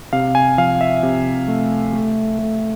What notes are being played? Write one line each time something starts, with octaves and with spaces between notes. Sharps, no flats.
C3 F5
G#5
F3 F5
E5
C3
A3
A3
A3